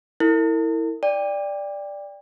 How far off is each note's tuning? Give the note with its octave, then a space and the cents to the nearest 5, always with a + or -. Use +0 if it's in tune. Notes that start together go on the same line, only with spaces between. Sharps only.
E4 -15 A#4 -40
D5 +0 G5 +25